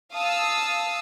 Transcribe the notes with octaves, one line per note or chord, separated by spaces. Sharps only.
F5 A5 D#6 E6